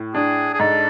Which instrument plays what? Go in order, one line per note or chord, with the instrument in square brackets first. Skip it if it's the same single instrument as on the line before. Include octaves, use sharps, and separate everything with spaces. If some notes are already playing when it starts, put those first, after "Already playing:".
Already playing: [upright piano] A2
[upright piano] D4 [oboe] G#4
[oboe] G#4
[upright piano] G#2 [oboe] A4